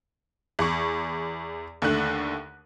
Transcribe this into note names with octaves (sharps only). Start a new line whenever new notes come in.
E2 C#6
D#2 D3 A3 F#6